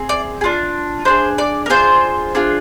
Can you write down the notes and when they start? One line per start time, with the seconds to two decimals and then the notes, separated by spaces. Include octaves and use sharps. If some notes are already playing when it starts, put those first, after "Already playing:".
Already playing: C4 G#4
0.09 D5
0.41 G#4
0.44 D4 F4
1.05 D4 F4 G#4 C5
1.38 D5
1.66 A#4
1.70 D4 F4 G#4 C5
2.35 D4 F4 G#4